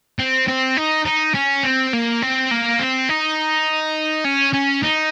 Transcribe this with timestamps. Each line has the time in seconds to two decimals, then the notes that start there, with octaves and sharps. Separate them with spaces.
0.19 C4
0.48 C4
0.77 D#4
1.05 D#4
1.34 C#4
1.63 C4
1.93 A#3
2.22 C4
2.51 A#3
2.80 C4
3.09 D#4
4.25 C#4
4.54 C#4
4.83 D#4